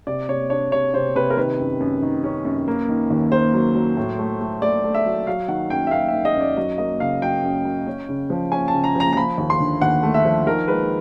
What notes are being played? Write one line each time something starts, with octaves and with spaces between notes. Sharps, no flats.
C3 D5
C3 C#5
D4 C#5
C3 C#5
C3 C5
C3 B4
A#4
D#3 B4
F#2
F#2
D#3
C#4
F#2
A#3
D#3
D#2
A#3 C5
F#3
F#3
A2
A3
A3
A3 D5
A3
E5
F#3
F#3 F5
D#3 F#5
F#2 G5
E5
F#2 F5
D#3 E5
D#5
F#2
D5
F#3 D#5
A#3 D#5
C#3 F5
F#3 G5
F#2
F#3
C#4
C#3
F3
C#4 G#5
A5
C#3
A#5
F3 A#5
A#5
F3 B5
D#2
C6
D3
D#2 F#5
A3
E5
F3
D#3 A#4
G#3 B4